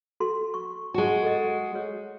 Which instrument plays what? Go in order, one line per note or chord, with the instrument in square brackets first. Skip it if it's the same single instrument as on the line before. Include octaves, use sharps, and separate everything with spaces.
[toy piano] F#4 A4 C6
C#6
[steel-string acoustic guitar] G#3 F#4
[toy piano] A4 D#5
C#5